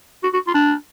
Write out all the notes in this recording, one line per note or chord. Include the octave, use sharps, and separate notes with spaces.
F#4
F#4
F4
D4